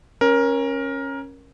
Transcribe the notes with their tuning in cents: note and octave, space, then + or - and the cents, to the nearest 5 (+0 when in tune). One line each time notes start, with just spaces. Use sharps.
C#4 -15 A#4 +15